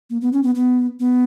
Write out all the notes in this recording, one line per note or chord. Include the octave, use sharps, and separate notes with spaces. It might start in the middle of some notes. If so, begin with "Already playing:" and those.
A#3
B3
C#4
B3
B3
B3